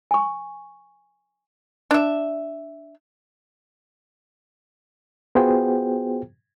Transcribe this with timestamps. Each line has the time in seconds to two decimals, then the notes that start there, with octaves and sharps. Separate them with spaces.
0.11 G#5 C#6
1.91 D4 E5
5.35 B3 F4 F#4 G#4 C5 G5